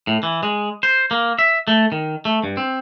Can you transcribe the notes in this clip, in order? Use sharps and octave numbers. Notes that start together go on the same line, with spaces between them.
A2
E3
G#3
C5
A#3
E5
A3
D#3
A3
G2
C4